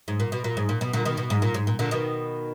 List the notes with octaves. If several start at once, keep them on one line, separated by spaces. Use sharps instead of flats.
G#2
A#2
B2
A#2
G#2
A#2
B2
A#2 D3
B2 D#3
B2
G#2
A#2
G#2
A#2
A#2 D3
B2 D#3